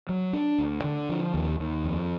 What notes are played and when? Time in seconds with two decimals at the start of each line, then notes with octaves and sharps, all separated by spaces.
0.09 F#3
0.33 D4
0.58 D2
0.84 D3
1.09 F3
1.34 D#2
1.60 D#2
1.84 F2